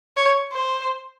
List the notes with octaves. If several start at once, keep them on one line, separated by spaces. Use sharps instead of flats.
C#5
C5